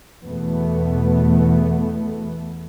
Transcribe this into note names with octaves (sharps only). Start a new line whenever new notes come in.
E2 B2 A3 B3